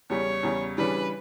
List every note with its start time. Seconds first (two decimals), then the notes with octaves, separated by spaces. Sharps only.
0.10 E2 C#3 G3 C#5
0.43 E2 C#3 G3
0.78 C#3 E3 G3 D4 B4